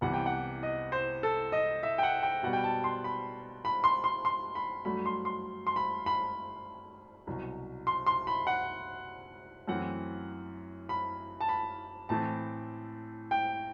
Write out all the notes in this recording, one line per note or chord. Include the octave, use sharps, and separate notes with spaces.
C2 C3 E3 B3 F#5
G5
F#5
D#5
C5
A4
D#5
E5
G5
F#5
G5
B2 G3 B3 F#5
G5
A5
C6
B5
B5
C6
C6
C6
B5
G2 F#3 A3 B5
C6
C6
C6
B5
B5
C2 B2 F#3
C6
C6
B5
F#5
F#2 E3 A3 C4 F#5
B5
A5
B5
A2 E3 A3 C4 A5
G5